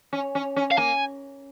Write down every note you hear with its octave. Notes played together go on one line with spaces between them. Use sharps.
C#4
C#4
C#4
F5
A#3 G#5